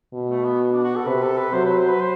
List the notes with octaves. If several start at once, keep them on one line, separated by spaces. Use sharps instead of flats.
B2
A3
B3
D4
F#4
A4
C3 B4
A4
B4
F#3 C5
B4
C5
B4
C5